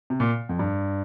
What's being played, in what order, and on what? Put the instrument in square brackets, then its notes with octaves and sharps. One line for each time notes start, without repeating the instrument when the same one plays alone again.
[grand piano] C3
A#2
F2
G2